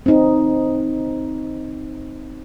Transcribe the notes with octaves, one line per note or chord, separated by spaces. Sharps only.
C4 D#4